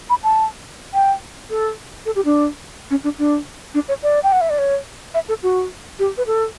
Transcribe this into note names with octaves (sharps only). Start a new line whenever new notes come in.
B5
A5
G5
A4
A4
G4
D4
C#4
D4
D4
D4
C#5
D5
G5
F#5
E5
D5
C#5
E5
A4
F#4
G4
B4
A4